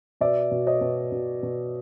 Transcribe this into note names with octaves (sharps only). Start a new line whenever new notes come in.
B2 D5 E5
B2
C#5 D#5
B2
B2
B2